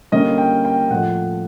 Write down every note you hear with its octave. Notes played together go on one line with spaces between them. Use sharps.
D3 G3 A#3 C#4 D#5
G5
G5
A2 F3 A3 F#5